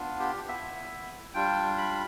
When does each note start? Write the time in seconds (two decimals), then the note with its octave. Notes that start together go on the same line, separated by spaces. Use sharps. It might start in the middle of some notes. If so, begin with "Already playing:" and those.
Already playing: B3 D4 F4
0.20 G4
0.48 B3 E4 E5
1.34 G3 D4 F4 G5
1.77 B5